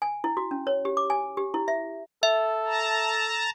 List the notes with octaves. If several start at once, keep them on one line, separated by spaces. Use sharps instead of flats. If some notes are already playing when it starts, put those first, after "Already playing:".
G#5
E4
F#4
C#4
C#5
G4
D6
G#5
G4
E4
E5
A4 E5
A5 A#5